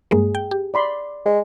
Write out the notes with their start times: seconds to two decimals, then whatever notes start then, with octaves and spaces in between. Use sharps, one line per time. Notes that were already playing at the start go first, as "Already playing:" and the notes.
0.11 G2 G#3 A#3 G#4
0.35 G5
0.51 G4
0.74 D5 B5 C6
1.25 G#3